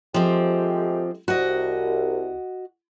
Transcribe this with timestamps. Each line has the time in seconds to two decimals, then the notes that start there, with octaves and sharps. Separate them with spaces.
0.14 F3 G#3 A3 C4 G4
1.28 C2 F#4 D#5